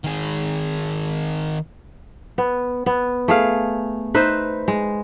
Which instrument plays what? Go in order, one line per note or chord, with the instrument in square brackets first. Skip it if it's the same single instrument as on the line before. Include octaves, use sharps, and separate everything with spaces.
[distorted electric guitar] D#3 G#4
[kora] B3
B3
A3 G#4 F5
D#4 B4 C5 E5
G#3